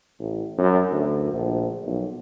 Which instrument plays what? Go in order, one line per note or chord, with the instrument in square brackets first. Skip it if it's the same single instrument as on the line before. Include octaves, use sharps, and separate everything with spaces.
[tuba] A1
F#2
D2
A#1
B1